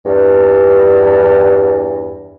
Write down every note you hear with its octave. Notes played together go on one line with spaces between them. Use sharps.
E2 G2